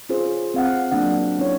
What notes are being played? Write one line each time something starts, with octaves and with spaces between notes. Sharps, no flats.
C#4 F4 G#4 C5
C4 F5 F#5
F#3 A#3 D4 F#5
C#4 E4 C#5